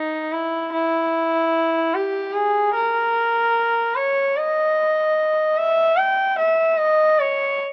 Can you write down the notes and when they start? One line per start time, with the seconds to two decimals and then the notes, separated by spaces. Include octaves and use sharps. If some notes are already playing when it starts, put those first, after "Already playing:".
Already playing: D#4
0.33 E4
0.73 E4
1.94 G4
2.34 G#4
2.75 A#4
3.95 C#5
4.37 D#5
5.58 E5
5.98 G5
6.39 E5
6.79 D#5
7.19 C#5